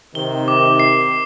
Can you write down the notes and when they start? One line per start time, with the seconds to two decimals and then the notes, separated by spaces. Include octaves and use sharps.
0.15 C3 D#3 G7
0.48 D6
0.80 C7